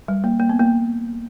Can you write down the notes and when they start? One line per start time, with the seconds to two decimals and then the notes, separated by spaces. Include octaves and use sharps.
0.08 G3
0.24 A#3
0.39 A#3
0.49 B3
0.59 A#3